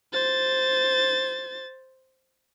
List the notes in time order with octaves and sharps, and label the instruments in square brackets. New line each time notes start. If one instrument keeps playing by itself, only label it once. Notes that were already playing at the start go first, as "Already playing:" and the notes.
[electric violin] C5 A6